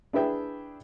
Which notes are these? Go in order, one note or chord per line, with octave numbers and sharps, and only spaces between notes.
D4 E4 G#4 B4 E5 G5